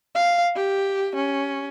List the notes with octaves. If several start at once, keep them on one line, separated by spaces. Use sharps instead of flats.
F5
G4
C#4